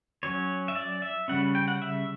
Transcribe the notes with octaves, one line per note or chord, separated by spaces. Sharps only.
F#3 C#4 C#5
E5
D5
E5
C#3 G3 C#4 F#5
G5
F#5
E5